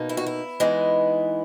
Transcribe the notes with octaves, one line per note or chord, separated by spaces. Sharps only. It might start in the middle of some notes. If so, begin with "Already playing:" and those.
Already playing: B2 A#3 D#4
E4
F#4
E4
E3 G#3 B3 D#4